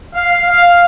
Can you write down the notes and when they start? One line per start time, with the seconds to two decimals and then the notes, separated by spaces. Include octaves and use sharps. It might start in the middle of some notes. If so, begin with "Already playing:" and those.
0.15 F5
0.47 F5